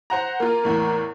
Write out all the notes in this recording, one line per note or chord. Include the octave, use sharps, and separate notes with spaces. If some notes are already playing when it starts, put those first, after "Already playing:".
C5 F#5 A#5
A#3 F4 A#4
E2 A2 A#3